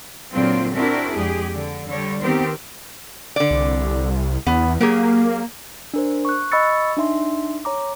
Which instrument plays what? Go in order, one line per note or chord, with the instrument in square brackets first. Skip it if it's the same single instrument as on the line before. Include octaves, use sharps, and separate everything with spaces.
[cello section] A#2 D3 F#3 A#3 C4 F4
C4 D4 E4 F#4 A#4
F2 G#3 G4 G#4
D3
D3 G3 C#5
D#3 B3 C4 G4 A#4 C5
[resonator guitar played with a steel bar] D3 D5
[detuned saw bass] C2
[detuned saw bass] E2 [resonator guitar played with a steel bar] B3
[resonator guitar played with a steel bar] F#3 G4 G#4 [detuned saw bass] A#3
[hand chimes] D4 A#4 C5
C#6 F#6
D#5 B5 C#6 E6 A6 C#7
D4 D#4 E5 C6
C#5 A#5 D6